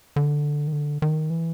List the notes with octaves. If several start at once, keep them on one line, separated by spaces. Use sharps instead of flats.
D3
D#3
D3
D#3
E3